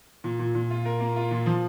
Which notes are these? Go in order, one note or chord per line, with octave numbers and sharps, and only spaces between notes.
A#2
A#2
A#2
F4
A#4
A#3
F4
A#2
F3